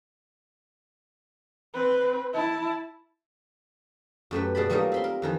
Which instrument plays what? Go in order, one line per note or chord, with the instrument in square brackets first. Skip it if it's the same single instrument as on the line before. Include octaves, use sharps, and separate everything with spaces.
[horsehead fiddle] C4 B4
E4 A5
[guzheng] F#2 A3 G4 B4
B2 G#3 D5 A5 B5
F#3 G3 A3 A#3 D#4 F4
C4 B5 C6
A#4
F2 D#3 E3